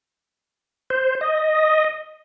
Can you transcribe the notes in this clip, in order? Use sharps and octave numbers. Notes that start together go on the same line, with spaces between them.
C5
D#5